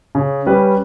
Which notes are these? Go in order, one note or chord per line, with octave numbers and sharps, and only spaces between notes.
C#3
G3 C#4 G4 B4